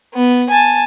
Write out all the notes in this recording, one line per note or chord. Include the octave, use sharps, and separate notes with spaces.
B3
G#5 A5